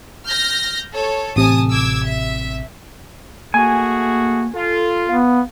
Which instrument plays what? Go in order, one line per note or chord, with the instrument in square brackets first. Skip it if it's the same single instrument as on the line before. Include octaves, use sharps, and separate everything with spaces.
[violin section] F6 G6 A#6
A4 C#5
[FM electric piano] A1 C3 [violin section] G#5 A5 D#6
[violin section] D6 E6 G#6
E5
[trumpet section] A3 F#4 G#4 [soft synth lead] A#3 [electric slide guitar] G#5
[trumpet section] F4 [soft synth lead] A4
[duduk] B3 [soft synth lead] F5